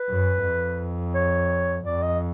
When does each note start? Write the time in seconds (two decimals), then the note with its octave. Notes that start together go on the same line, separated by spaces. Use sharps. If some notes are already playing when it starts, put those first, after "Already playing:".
Already playing: B4
0.10 F#2
0.45 F2
1.15 C#5
1.85 F2 D5
2.02 D#5